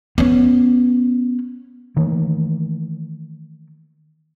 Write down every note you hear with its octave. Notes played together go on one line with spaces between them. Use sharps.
B3 C#4
D#3 E3 A3 A#3